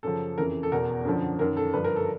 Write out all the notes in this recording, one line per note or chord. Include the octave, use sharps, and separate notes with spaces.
F#2 C#3 F3 A4
F2 C#3 E3 A#4
A4
E2 B2 A#4
F#2 D3 F3
F#2 D#3 A#4
A4
G2 D3 F3 B4
A#4
A4